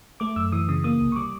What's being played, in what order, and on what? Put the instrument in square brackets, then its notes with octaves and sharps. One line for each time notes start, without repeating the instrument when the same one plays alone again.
[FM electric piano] A3 D6
F#2 E6
E3 D#6
C#3 D#6
A#3 D#6
C2
C#6
G3 D6